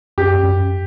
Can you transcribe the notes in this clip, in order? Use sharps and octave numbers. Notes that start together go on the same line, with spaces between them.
F#2 G4
F#2